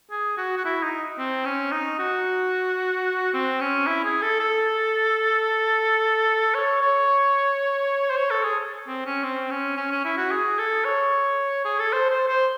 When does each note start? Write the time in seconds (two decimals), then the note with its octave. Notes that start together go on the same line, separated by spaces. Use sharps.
0.11 G#4
0.37 F#4
0.57 F#4
0.65 E4
0.83 D#4
1.19 C4
1.45 C#4
1.72 D#4
1.99 F#4
3.34 C4
3.60 C#4
3.87 E4
4.04 G#4
4.22 A4
4.40 A4
6.55 C#5
6.82 C#5
8.10 C5
8.17 C#5
8.30 A4
8.43 G#4
8.87 C4
9.06 C#4
9.23 C4
9.51 C#4
9.77 C#4
9.91 C#4
10.05 E4
10.17 F#4
10.31 G#4
10.58 A4
10.85 C#5
11.65 G#4
11.79 A4
11.93 C5
12.10 C5
12.27 C5